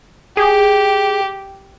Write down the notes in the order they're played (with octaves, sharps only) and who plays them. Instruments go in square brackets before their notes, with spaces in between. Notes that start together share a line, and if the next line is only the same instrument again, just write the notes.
[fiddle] G4 [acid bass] G#4